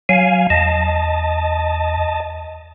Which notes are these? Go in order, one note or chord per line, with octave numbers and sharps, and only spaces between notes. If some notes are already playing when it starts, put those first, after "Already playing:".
F#3 F5 G#5
E2 D#5 A5